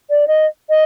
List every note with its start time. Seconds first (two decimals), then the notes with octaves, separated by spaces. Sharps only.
0.10 D5
0.28 D#5
0.70 D#5